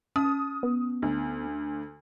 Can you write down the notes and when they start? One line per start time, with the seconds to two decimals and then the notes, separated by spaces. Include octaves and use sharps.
0.16 C#4 D#6
0.63 B3
1.02 D2